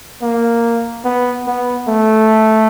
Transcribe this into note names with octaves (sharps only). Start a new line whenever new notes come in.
A#3
B3
B3
A3